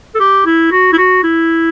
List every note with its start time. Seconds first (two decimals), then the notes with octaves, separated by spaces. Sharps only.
0.15 A4
0.20 G4
0.46 E4
0.71 F#4
0.93 E4
0.98 F#4
1.24 E4